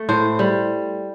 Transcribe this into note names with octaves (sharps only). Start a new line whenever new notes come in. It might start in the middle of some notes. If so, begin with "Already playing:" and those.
Already playing: A3
A2 C5
G3